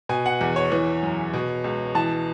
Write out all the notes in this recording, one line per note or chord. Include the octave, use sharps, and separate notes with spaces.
B2 G#5
F#5
E2
C#5
E3
F#2
B2
C#2
E3 A5